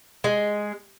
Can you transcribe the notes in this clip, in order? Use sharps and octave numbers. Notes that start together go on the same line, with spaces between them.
G#3